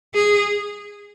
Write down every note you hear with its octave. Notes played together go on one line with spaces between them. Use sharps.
G#4